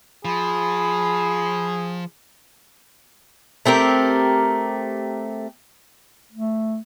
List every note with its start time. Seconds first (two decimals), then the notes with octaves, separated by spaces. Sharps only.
0.25 F3 G#4 B5
3.65 A3 C4 G4 A#4
6.33 A3